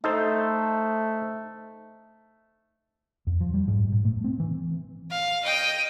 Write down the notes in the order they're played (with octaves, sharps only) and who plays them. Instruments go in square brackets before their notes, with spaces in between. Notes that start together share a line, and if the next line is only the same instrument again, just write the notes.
[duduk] A3 [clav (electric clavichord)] D#4 A4 C5
[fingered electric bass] F2
F3
G3
G#2
A2
A3
C4
E3
[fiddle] F5
D#5 G5